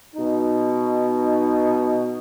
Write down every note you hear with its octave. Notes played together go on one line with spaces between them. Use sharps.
B2 D#4